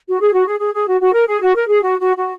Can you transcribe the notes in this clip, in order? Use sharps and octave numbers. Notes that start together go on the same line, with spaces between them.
F#4
G#4
F#4
G#4
G#4
G#4
F#4
F#4
A#4
G#4
F#4
A#4
G#4
F#4
F#4
F#4